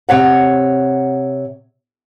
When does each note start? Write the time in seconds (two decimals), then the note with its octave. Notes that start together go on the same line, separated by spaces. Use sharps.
0.09 C3 C#5 F#5